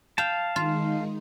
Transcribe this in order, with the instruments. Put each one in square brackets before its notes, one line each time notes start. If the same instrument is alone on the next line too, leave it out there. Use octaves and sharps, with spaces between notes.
[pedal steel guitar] F5 A5 [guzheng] G5
[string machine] D#3 G#3 D#4 [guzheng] F4